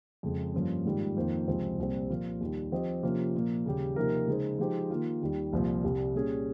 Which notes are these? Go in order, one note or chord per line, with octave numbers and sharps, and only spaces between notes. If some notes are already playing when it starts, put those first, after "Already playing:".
F2 C#3 G#3
G2 F3 A#3 C#4
G#2 D#3 G3 A#3 F4
F2 D#3 A#3 F4 C5
C#2 C3 F3 C4
C2 A#2 G3 C4
A#2 F3 A#3 F4
D#2 D#3 G3
F3 C4 G4 C5 D#5
C3 F3 A#3 C#4 F4
A#2 F3 A#3
D#2 C#3 G3 C#4 G4
C3 F3 A#3 D#4 A#4
C#3 G#3 D#4 G#4 C5
F3 G#3 D#4 G4 C5
D#3 A#3 F4
D#2 D#3 G3
C2 A#2 F3
C2 C3 G3
A#2 G3 C#4 G#4